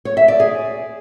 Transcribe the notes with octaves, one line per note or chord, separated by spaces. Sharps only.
C#5
E5
D5
G#4